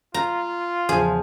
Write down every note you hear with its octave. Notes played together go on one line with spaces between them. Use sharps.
F4 A#5
E2 C#3 F3 G#4